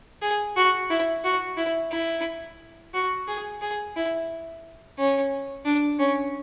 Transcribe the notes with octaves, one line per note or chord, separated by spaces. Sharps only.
G#4
F#4
E4
F#4
E4
E4
F#4
G#4
G#4
E4
C#4
D4
C#4